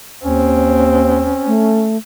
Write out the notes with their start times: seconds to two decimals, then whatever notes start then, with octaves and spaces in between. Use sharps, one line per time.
0.25 D#2 C4 C#4
1.47 A3